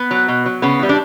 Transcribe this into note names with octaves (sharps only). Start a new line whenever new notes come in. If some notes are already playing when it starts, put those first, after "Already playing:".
Already playing: B3
F#3
B2
F#3
C#3 B3
E3 G3
D4